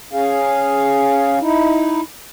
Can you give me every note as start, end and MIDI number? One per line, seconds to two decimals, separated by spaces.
0.13 1.39 61
0.13 1.39 68
0.13 1.39 77
1.41 2.01 63
1.41 2.01 64